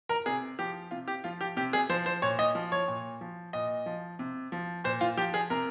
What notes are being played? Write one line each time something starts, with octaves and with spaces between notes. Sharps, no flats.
A#4
C3 G#4
F3 G4
C3 F4
G4
F3 F4
G4
C3 G4
G#4
F3 C5
C5
A#2 C#5
D#5
F3
C#5
A#2
F3
A#2 D#5
F3
C3
F3
A#2 C5
F4
F3 G4
G#4
C3 A#4